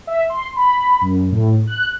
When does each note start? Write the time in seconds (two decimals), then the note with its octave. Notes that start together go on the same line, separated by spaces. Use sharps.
0.07 E5
0.30 C6
0.56 B5
1.01 F#2
1.32 A2
1.67 F#6